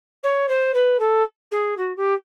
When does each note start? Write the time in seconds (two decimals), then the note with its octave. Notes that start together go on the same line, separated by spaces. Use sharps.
0.23 C#5
0.48 C5
0.74 B4
0.99 A4
1.51 G#4
1.77 F#4
1.96 G4